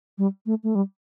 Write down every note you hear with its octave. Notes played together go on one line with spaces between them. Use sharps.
G3
A3
A3
G3